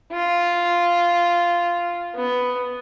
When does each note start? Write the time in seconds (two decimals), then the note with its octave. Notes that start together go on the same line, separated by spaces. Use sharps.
0.12 F4
2.15 B3